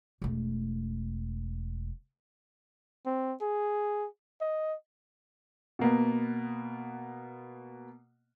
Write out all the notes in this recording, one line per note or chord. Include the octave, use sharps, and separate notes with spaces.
E1 A3
C4
G#4
D#5
B2 A#3 B3